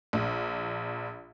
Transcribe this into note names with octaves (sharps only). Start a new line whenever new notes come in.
A#1